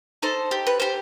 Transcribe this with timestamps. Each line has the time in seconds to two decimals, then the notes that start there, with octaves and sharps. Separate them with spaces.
0.22 D#4 A4 C5
0.51 G4
0.67 B4
0.80 G4 C5